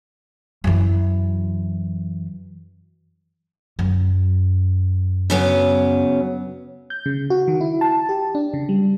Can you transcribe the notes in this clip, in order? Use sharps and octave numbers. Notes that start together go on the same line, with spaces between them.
F#2 E3
F#2
C#3 F#3 B3
G6
C#3
F#4
D#3
E4
A5
G4
D4
C#3
G3